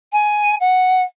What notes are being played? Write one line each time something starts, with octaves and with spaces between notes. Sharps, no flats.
G#5
F#5